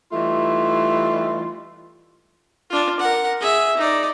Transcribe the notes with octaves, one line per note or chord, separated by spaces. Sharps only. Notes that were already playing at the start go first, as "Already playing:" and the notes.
E3 G3 A3 D#4 F4
D4 F4
A#4 F#5
G#4 E5
D#4 D5